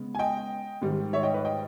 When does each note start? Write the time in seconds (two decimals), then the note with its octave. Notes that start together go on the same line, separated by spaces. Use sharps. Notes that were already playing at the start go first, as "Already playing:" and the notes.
Already playing: C#3 G#3 B3
0.15 G#5
0.19 D#5 G5
0.82 G#2 D#3 G3
1.13 C#5 E5
1.23 D#5 G5
1.34 B4 D#5
1.45 D#5 G5